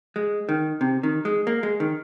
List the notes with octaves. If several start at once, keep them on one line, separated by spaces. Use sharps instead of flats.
G#3
D#3
C3
D#3
G#3
A#3
G#3
D#3